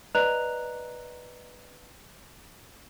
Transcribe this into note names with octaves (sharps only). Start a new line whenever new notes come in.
B4 D5 D#5 A#5 F#6 F7